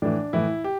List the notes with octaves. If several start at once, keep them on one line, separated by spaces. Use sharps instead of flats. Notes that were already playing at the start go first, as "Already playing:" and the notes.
A2 E3 D4
A2 E3 E4
G4